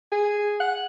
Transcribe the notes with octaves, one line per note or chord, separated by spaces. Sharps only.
G#4
F#5